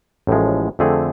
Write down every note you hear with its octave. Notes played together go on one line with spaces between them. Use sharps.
A1 A2 F3 G#3
F2 D3 A3 C4 G#4